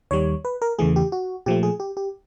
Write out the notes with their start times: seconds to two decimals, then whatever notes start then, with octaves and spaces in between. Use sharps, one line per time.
0.11 D#2 D#3 G3 C#5
0.45 B4
0.62 A#4
0.78 E2 C#3 E3 A3 G#4
0.96 G4
1.12 F#4
1.46 A#2 F3 A3 G4
1.63 G#4
1.80 G4
1.97 G4